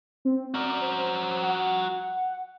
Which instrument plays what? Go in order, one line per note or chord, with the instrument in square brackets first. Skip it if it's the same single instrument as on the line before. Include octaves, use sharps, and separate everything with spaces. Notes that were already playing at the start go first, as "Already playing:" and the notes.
[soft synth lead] C4
[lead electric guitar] F#4 A#4 [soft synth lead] D5
[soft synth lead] C5
F#5